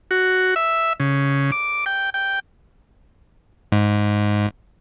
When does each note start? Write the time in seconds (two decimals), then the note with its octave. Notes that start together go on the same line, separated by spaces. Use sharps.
0.11 F#4
0.56 E5
1.00 C#3
1.52 D6
1.86 G5
2.14 G5
3.72 G#2